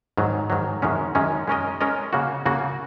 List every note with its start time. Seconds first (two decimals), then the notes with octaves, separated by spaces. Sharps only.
0.17 G#2 D#3 F#3
0.50 G#2 D#3 F#3
0.82 F#2 D#3 G#3 C#4
1.15 F#2 D#3 G#3 C#4
1.48 G#3 C#4 A#4 D#5
1.81 G#3 C#4 A#4 D#5
2.13 C#3 A#3 F#4
2.46 C#3 A#3 F#4